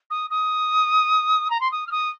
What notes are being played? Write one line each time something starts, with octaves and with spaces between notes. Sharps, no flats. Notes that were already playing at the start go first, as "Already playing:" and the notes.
D#6
D#6
A#5
C6
D#6
F6
D#6